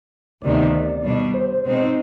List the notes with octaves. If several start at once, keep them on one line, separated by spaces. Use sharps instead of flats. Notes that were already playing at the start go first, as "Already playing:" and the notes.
D2 C3 D#3 B3 D5
B2 G3 D4
C5
B2 G#3 C4 D#4